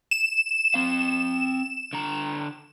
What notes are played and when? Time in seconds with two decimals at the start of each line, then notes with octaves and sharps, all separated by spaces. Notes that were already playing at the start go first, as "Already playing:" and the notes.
0.11 E7
0.74 C4 F5
1.93 D3 A#5